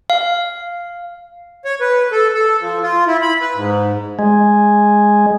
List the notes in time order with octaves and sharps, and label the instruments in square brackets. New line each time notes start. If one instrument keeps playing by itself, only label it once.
[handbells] F5
[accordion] C#5
B4
A4
A4
F3
F4
E4
B5
B4
G#2
[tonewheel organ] G#3